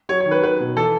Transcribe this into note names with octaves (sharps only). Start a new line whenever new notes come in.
F#3 C#5
C#5
D#3
B4
F#3 B4
B2
E3 A4